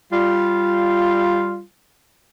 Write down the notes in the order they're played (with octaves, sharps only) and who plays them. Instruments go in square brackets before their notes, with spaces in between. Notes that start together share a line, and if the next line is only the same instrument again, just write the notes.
[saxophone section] G3 F4